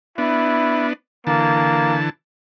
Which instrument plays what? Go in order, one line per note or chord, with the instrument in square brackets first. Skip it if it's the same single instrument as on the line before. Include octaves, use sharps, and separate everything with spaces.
[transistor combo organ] B3 D4 [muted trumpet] E4
[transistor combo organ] D3 E3 A5 [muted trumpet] A#3